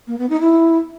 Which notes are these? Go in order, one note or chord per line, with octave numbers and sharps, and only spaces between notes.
A#3
B3
D#4
E4